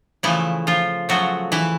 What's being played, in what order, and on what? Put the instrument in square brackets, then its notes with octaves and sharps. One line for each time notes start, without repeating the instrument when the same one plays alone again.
[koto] C#3 E3 F3 A3 E4
F3 F4
C#3 F3 F#3 A3 F#4
E3 E4